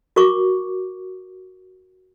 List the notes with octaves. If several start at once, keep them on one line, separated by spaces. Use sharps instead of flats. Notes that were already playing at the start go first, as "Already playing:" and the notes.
F#4 A#4 C#6 D6